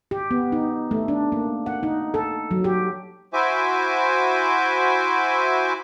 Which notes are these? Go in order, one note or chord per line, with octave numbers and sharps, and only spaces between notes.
G4
B3
D#4
A3
D4
A#3
F#5
D#4
A4
F#3
G4
E4 F#4 C5 E5 G#5 D6